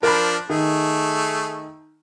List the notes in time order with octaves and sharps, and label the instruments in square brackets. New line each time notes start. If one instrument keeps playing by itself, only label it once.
[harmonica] F3 D4 [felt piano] A#4 B5
[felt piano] D#3 [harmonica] A3 G#4